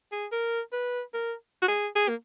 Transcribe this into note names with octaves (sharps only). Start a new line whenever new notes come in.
G#4
A#4
B4
A#4
F#4
G#4
G#4
A#3